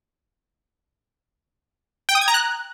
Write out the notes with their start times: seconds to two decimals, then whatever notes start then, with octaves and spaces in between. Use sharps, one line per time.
2.09 G5
2.15 D#6
2.21 G#6
2.28 A#5
2.34 F#6